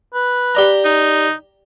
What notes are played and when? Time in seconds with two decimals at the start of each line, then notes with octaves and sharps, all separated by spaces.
0.14 B4
0.55 G4 D5 A#5
0.85 D#4